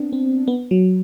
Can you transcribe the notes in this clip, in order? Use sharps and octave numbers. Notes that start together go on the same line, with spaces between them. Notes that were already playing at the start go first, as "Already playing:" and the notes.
Already playing: B3 C4 D4
C4
B3
F#3